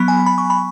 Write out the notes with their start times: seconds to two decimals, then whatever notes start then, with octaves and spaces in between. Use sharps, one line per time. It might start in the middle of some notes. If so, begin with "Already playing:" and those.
Already playing: F#3 B3 B5
0.08 G#5
0.26 B5
0.38 C#6
0.50 B5